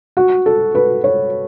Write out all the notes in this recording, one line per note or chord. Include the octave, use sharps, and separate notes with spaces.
F#4
A4
B4
C#5